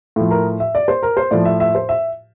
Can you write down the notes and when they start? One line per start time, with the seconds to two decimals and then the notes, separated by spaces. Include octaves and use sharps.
0.16 A2 F3
0.31 A#4
0.60 E5
0.75 D5
0.88 C5
1.03 A#4
1.17 C5
1.31 A2 F3 D5
1.45 E5
1.60 E5
1.75 C5
1.89 E5